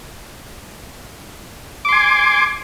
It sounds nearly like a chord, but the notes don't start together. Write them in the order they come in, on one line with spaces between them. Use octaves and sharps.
D6 C6 G#5